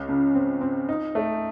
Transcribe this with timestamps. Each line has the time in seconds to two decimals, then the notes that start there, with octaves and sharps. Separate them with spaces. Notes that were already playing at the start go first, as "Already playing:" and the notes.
Already playing: C#2 C#4
0.09 C#3
0.35 C4
0.61 C4
0.89 D#4
1.15 A3